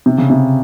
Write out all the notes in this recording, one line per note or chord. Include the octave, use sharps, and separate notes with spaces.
C3
C#3
C3